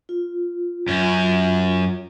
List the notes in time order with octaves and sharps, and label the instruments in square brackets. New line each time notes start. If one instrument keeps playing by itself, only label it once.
[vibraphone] F4
[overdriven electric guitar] F#2 C#4